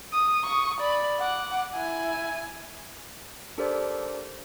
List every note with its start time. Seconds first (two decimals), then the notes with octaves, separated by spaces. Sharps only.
0.13 D#6
0.44 C#6 D#6
0.81 D5 B5
1.20 F#5 D6
1.75 E4 G#5
3.58 D4 G4 A4 A#4 C5 D5